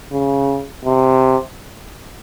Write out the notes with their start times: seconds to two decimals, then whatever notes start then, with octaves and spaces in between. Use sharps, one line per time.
0.12 C#3
0.85 C3